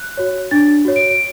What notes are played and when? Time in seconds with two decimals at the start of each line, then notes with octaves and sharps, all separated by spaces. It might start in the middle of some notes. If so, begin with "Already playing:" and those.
Already playing: F#6
0.17 F#4 C#5
0.51 D4 A6
0.85 F#4 C#5
0.96 D7
1.10 D7